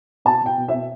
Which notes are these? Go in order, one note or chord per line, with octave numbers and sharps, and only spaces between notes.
B2 A5
B2 G5
B2
B2 E5